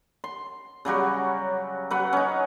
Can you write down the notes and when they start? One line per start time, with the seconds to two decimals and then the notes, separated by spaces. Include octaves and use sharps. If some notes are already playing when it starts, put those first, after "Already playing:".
0.24 C6
0.85 C#3 F#3 G3 F#4
1.91 F#3 B4 F#5
2.13 C#4 D#4